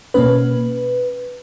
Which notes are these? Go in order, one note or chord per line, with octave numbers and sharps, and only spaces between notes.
B2 A#3 C#4 B4